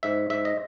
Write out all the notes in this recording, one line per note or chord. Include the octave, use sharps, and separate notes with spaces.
G#2 E5
G#2 E5
D#5